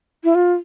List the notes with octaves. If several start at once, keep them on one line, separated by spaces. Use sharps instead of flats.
E4
F4